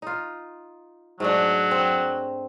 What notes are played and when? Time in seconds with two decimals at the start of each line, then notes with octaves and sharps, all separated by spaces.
0.02 D#4 F4
1.20 G#2 F#3 A3 D4
1.71 C4